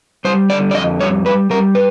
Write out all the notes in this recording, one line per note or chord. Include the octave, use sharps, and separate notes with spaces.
G3 C5
D3 D5
D5
F2 D#5
G3 C#5
G3 B4
G3 A#4
B4